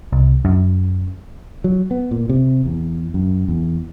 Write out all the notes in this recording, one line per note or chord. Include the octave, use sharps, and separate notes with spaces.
C2
F#2
F#3
B3
A#2
C3
E2
F#2
E2